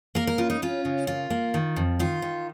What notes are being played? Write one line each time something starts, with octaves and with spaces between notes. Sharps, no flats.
A#3 A#4
A#4
C#3 F4
D#4
C#4 F4
C#3
A#3 F4
A#3
D#3
F2
D#3 F4
D#3